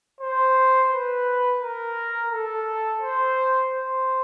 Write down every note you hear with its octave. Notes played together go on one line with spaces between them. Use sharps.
C5
B4
A#4
A4
C5
C5